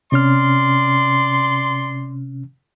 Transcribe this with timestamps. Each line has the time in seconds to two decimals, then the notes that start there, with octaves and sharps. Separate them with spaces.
0.12 C3 C#4 D5 C6 F6